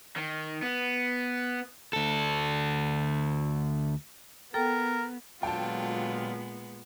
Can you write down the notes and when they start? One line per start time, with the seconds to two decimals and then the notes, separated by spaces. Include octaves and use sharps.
0.16 D#3
0.63 B3
1.93 D2 A4
4.54 B3 A4 A#4 G5
5.43 A#2 D3 F#3 G#3 B3 F4 G5 A5